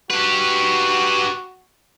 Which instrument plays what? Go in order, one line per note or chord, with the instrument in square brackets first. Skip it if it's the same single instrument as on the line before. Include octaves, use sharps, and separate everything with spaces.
[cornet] F#4 [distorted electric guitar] G4 B4